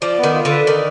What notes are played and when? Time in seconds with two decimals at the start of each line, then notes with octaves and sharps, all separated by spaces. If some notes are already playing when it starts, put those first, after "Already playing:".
0.02 F3 D5
0.18 B3
0.23 D#3
0.34 F4
0.45 D3 B4
0.66 D#3 D5